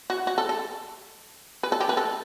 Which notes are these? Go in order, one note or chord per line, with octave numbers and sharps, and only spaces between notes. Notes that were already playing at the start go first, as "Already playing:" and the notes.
F#4
F#4
A4
A4
B4
A4
G4
B4
A4